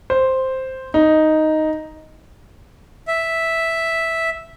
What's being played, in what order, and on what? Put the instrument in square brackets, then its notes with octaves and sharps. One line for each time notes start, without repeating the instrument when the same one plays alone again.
[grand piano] C5
D#4
[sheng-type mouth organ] E5